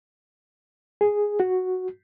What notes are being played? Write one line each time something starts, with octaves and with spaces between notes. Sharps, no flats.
G#4
F#4